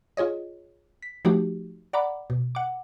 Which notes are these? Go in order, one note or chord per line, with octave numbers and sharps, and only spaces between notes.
F4 G#4 C#5 D#5
B6
F3 A3 D#4 F#4 G4
D5 F#5 A#5 B5 D6
B2
F#5 D6